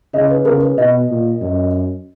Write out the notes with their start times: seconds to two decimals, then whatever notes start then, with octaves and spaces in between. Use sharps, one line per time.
0.14 C#3 D#5
0.30 B4
0.45 C#3 A#4
0.61 B4
0.77 B2 D#5
1.09 A#2
1.41 F#2